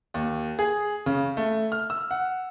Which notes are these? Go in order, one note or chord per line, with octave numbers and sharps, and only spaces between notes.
D#2
G#4
C#3
A3
F6
E6
F#5